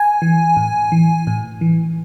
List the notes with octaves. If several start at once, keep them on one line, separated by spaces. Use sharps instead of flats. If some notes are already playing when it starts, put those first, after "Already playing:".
Already playing: G#5
E3
A2
E3
A2
E3